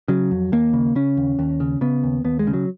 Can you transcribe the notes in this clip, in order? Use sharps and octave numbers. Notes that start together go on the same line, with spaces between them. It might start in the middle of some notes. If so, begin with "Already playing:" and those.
C#3 F#3
F2
D#2 A#3
C#3
C#3 C#4
D#2
D#2
C#3
C#3 B3
D#2
D#2 B3
G#3
C#3
F#3